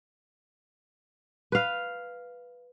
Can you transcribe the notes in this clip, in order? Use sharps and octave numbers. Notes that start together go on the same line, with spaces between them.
B4 F5